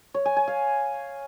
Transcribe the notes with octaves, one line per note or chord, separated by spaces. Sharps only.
C#5
G#5
G#5
F5